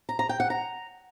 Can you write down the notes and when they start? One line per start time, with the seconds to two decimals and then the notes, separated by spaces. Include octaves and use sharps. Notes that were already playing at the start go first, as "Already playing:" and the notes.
0.09 A#5
0.19 A#5
0.29 G5
0.40 F#5
0.50 A#5